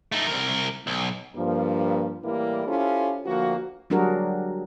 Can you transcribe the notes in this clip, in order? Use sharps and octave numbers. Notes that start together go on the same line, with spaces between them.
A3 D#4
C2 A#4
B1
G2 F3 A#3
A2 E3 G3 A#3 E4
C#4 E4 F4 G4 A4 C5
D2 F3 A#3 F#4
F#3 G3 D4 F#4 G#4 A#4